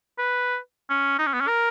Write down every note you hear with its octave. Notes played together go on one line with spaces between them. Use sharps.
B4
C#4
D#4
C#4
B3
C#4
A#4